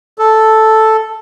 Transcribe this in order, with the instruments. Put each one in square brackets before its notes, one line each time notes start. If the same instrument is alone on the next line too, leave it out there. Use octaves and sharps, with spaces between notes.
[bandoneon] A4